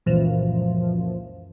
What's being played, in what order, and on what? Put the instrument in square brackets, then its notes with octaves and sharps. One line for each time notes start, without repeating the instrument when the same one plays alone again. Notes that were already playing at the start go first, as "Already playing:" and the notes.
[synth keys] C#2 F#2 A#2 E3 F3